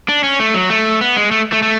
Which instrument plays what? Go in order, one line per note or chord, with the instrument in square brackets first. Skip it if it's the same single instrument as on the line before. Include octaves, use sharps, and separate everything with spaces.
[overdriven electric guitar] D4
C#4
A3
F#3
A3
B3
G#3
A3
A3
A3